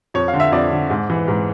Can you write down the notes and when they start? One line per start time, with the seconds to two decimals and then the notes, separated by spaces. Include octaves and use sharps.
0.14 F2 C#5
0.28 F5
0.34 D3
0.40 E5
0.52 F2 D5
0.71 D3
0.90 G#2
1.10 E3
1.28 G#2